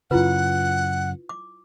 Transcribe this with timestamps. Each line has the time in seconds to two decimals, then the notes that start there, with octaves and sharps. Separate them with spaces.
0.11 F#2 C#3 E4 F4 B4 F#5
1.29 D6